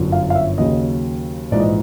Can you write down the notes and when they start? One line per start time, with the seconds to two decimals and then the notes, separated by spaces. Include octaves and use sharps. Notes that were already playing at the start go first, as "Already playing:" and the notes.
Already playing: G1 F#2 D3 F3
0.12 F5
0.30 F5
0.35 E5
0.58 D#2 C#3 F#3 D#5
1.51 A#1 G#2 E3 D5
1.60 D#5